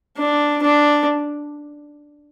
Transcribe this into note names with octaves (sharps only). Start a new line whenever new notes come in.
D4
D4